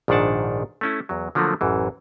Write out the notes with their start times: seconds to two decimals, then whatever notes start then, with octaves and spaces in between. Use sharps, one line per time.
0.08 A#1 G#2 D#3 D4 F#5 A5
0.81 A3 C#4 E4
1.09 E2 F#3
1.35 D3 F3 F#3 A3 A#3
1.61 A1 F#2 E3